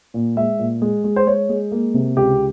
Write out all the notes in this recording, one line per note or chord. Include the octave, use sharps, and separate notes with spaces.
A#2
G#3 E5
A#2
G#3
G#3
C5
G#3 C#5
G#3
A#3
C3
C#2 G4